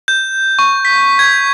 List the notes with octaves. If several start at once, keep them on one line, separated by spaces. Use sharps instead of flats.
G6
C#6
B6
G#6